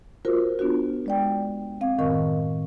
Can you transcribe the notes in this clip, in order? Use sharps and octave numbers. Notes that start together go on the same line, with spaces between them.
F4 F#4 A#4 C5
B3 D4 F4 F#4
G#3 D5 G5
C4 F5
F#2 A2 D#3 A#4 D#5 C#6